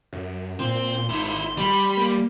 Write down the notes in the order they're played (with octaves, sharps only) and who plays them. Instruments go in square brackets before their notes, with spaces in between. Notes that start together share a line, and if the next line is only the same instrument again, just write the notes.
[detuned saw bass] F#2
[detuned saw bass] A#2 [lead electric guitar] C4 [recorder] C6
[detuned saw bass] G#1 [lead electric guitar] D#4 E4
[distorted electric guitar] G3 [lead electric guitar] B5
[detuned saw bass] A#3